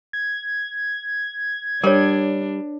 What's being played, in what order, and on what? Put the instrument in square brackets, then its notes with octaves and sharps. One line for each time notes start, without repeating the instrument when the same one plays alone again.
[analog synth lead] G#6
[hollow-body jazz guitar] G3 [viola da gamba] D4 [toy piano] A#4 C#5